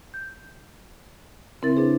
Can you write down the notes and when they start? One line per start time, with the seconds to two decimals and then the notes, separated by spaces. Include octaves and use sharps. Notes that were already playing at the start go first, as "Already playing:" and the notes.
0.14 G6
1.62 C#3 C4 E4 A#4 E5 A6
1.75 C4 D4 E4 G#4 B4 C5